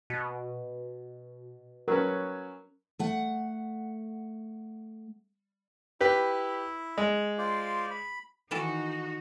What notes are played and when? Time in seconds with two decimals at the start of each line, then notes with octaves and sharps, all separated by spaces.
0.10 B2
1.88 F#3 C#4 A#4 B4
2.99 A3 F#5
6.01 E4 G4 B4
6.98 G#3
7.38 F4 C5 D5
7.91 B5
8.51 D#3 E3 D#4 F#4 A4